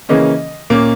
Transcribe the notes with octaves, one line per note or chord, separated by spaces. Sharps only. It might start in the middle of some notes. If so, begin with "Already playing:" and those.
C#3 E3 A#3 C#4 D#5
A#2 A#3 C#4